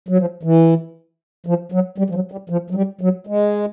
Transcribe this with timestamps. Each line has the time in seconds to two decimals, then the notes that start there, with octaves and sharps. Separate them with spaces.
0.09 F#3
0.18 F3
0.43 E3
1.46 F3
1.72 F#3
1.98 G3
2.10 F3
2.15 F#3
2.32 G3
2.50 F3
2.70 F#3
2.75 G3
3.01 F#3
3.27 G#3